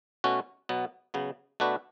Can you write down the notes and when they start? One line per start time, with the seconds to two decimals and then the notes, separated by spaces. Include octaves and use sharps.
0.24 B2 A3 C#4 F#4
0.69 B2 F#3 B3
1.14 C#3 F#3 B3
1.60 B2 A3 D4 F#4 B4